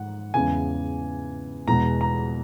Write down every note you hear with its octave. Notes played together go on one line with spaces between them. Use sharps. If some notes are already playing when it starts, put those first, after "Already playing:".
Already playing: G#2 F#5
E2 C#3 E3 G#3 G#5
E2 B2 G#3 A#5
A#5